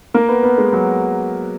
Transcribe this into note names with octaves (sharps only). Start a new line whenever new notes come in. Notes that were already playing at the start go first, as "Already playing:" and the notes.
A#3 A#4
B3 B4
B3 B4
G#3 G#4
F#3 F#4